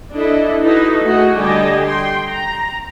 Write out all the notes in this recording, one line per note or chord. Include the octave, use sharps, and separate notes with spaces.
D4 E4 A4 D#5
D#4 E4 F#4 A4 B4 D#5
A3 F#4 G#4 D#5
D3 G3 G4 D#5 G#5 A5
G5 C6
A#5